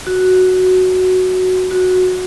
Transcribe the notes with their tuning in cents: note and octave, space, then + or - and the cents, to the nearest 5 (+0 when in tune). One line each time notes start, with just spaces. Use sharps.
F#4 +0
F#4 -10